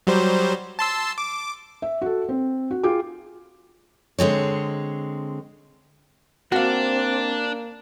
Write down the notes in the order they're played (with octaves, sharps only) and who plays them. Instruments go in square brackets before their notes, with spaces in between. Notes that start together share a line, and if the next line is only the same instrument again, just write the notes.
[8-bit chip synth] F#3 G3 C5
A5 C6 E6
D6
[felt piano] E5
F#4 A4
C4
F#4
F4 G#4 G5 D6
[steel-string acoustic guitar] D3 G#3 C4 C#5
[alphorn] A#3 [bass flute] C4 [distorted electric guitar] D4 [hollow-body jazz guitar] F#4 F5